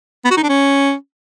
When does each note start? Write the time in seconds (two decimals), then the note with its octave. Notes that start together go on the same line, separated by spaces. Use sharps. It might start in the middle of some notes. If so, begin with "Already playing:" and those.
0.25 B3
0.31 F#4
0.37 D#4
0.43 D4
0.49 C#4